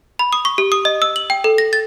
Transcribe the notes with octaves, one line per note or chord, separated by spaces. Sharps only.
B5
D#6
C#6
G4
D#6
D#5
E6
F#7
G5
A4
A#6
A6